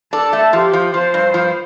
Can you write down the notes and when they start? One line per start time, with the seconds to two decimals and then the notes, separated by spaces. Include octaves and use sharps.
0.13 D4 A4
0.33 A3
0.53 F3 G4
0.73 F3
0.93 F3 C5
1.14 G2
1.34 F3